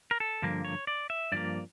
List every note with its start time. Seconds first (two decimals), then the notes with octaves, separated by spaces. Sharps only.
0.11 A#4
0.20 A4
0.42 G2 D3 F3 A#3
0.65 C#5
0.87 D5
1.10 E5
1.32 G2 F3 A#3 D5